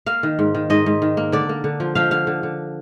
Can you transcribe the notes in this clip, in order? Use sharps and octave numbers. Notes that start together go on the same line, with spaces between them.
A#3 F5
D#3
G#2
D#3
G#2 D#5
G#2
D#3
A#3
D3 D5
A#3
D3
F3
F3 F5
D3 F5
D3
D3